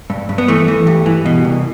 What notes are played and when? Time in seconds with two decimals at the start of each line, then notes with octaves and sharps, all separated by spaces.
0.10 G2
0.29 G2
0.38 B3
0.48 E3 A3
0.68 E3
0.87 G2
1.06 E3
1.26 B2
1.45 C2